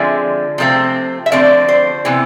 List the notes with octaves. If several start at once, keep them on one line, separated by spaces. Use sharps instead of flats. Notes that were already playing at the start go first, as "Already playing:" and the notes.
Already playing: D3 F3 G#3 C4 E5
C3 F3 A3 C4
E5
D3 F3 A3 C4 D5
C5
C3 E3 B3